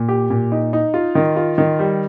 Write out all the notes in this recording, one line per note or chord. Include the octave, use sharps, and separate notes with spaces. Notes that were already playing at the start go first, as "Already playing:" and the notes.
Already playing: A#2
G4
A#2
D#4
D#4
F4
D#3
F4
D#3
G3